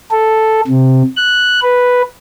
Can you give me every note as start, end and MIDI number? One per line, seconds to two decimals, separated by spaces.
0.11 0.61 69
0.67 1.02 48
1.17 1.60 90
1.62 2.02 71